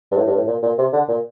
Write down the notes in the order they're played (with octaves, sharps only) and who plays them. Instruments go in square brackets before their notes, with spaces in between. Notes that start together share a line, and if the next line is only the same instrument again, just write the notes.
[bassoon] G2
A2
G2
A2
A#2
A#2
C3
D3
A#2